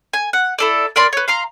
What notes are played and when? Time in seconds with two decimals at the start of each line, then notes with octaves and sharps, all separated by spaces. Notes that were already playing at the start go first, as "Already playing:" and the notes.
0.13 G#5
0.33 F#5
0.59 E4 A4 D5
0.96 A#4 D5 B5 C6
1.13 B4 C#5
1.28 F5 A#5 C6